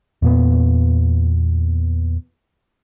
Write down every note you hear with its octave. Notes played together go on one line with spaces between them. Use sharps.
E2 A#2 B3